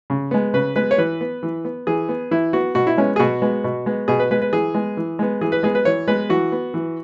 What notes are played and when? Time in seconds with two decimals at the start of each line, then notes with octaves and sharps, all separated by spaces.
0.10 C#3
0.31 G#3 B3
0.54 C#3 B4
0.76 G#3 B3 B4
0.91 C#5
0.98 E3 B4
1.21 B3
1.43 E3
1.65 B3
1.87 E3 G#4
2.09 B3
2.31 E3 E4
2.53 B3 F#4
2.75 B2 F#4
2.87 E4
2.98 G#3 B3 C#4
3.16 G#4
3.19 B2 F#4
3.42 G#3 B3
3.64 B2
3.86 G#3 B3
4.08 B2 G#4
4.19 B4
4.31 G#3 B3 B4
4.42 B4
4.53 E3 G#4
4.75 G#3 B3
4.97 E3
5.19 G#3 B3
5.41 E3 G#4
5.52 B4
5.63 G#3 B3 G#4
5.75 B4
5.85 E3 C#5
6.08 G#3 B3 B4
6.29 E3 F#4
6.52 B3
6.74 E3